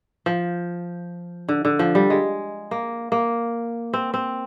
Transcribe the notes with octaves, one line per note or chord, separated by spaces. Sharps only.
F3
D3
D3
F3
G3
G#3
A#3
A#3
C4
C4